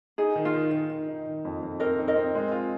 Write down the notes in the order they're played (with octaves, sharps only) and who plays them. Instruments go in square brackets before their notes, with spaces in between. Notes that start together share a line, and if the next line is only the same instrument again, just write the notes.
[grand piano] D#4 [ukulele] G#4
[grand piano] D#3
[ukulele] F4
[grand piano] D#3
D#3
D#3
D#4
D#3
F2
F2
[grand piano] C4 [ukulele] A#4 D#5
[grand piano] D#4
[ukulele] A#4 D#5
[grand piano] C4
G#3
F4